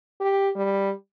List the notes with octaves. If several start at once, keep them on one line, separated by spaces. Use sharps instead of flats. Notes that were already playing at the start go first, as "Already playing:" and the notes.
G4
G3